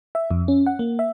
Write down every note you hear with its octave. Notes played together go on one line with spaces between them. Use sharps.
E5
F2
C#4
F#5
A#3
E5